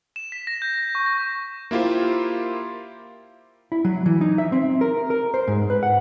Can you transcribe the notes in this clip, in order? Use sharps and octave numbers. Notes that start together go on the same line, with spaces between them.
E7
B6
A#6
G6
A#6
C#6
A#6
A#3 E4 F4 G4 C5
E4
F#3
E3
D#4
E5
C4
A#4
A#4
C5
G#2
B4
F#5